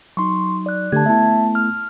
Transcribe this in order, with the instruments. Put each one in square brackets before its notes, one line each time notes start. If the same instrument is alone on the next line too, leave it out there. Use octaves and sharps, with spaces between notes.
[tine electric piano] F#3 D#4 [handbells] C6 C#6
[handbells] D5 F#6
[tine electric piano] D3 A3 G4 [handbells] A5 G#6
[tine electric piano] A3 B3 E4 [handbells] E5 A5
[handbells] F6